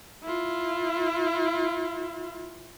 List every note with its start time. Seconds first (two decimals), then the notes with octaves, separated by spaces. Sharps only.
0.23 E4 F4